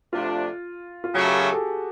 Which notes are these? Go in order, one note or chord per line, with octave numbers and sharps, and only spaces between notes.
C3 F3 A3 D4 F4
F4
C#3 F#3 A3 F#4
G4
G#4
A4